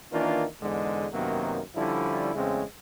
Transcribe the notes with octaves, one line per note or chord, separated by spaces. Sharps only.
D#3 E3 A#3 C#4 D4 F4
E2 G#2 D3 G#3
F#2 C3 D#3 F#3 A#3 B3
D3 F3 G3 C#4 E4
E2 C#3 G#3 A3 C4 C#4